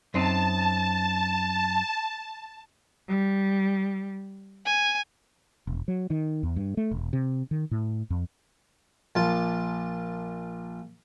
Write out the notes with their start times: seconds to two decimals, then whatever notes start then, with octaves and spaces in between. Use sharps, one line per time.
0.14 F#2 C4 D#4 A5
3.07 G3
4.64 G#5
5.67 E1
5.88 F#3
6.10 D#3
6.43 E2
6.56 G2
6.77 A3
6.92 E1
7.13 C3
7.51 D#3
7.71 A2
8.10 F2
9.15 A#1 F4 A5